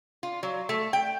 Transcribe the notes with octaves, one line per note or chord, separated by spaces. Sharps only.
F4
F#3
A3
G5